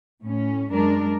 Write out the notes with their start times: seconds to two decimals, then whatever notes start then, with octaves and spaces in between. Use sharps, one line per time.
0.22 A2 C#4
0.72 F#2 G#3 D4 A#4